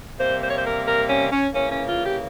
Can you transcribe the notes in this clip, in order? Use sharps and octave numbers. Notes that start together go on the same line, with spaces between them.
C3 G3 A#3 C5
C5
C#5
C5
A#4
A#4
C#4
C#4
C#3 E3 A#3 C#4
C#4
F4
G4